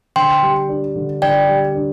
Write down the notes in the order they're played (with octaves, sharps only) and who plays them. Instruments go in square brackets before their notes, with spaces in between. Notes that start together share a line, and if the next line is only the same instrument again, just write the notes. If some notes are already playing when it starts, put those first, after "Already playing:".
[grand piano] D3 [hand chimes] G5 C6
[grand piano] G3
D4
D3
[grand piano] D3 [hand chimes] D5 G5
[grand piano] G3
D4